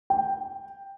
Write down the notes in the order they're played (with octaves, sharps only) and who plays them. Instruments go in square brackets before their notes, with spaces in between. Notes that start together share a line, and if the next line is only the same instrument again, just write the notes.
[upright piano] G5